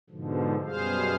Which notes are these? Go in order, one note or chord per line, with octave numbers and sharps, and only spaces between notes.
G#2 B2 D3 F3
F#2 B2 G3 G#4 C5 F5